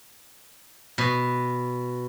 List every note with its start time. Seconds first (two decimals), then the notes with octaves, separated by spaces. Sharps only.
0.98 B2